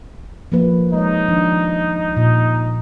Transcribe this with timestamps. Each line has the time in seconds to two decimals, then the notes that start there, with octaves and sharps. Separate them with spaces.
0.52 F3 A#3 B4
0.93 G#3 D#4 C#5
1.28 D#3 F3 D4
2.16 A#2